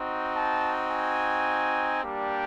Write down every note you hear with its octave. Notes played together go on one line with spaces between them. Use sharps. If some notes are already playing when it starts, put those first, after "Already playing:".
Already playing: C4 D#4 F#4
A5
G#5
G3 A#3 D4 G4